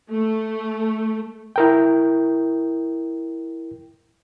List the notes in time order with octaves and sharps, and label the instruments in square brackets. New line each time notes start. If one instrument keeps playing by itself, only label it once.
[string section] A3
[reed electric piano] E4 A#4 G5